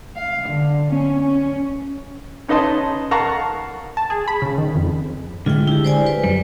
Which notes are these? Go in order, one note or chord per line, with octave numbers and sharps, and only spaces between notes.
F5
D3
C#4
C#4
C#4 D#4 B4 D#5 A5 C6
A#4 F5 F#5 A5 A#5 C#6
A5
G#4
B5
C#3
D#3
F2
D3 G#3 A3 F4 G5
E4 G4
C5 D5 G#5
B4
F#2 G3